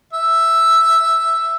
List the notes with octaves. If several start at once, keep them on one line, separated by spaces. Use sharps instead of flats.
E5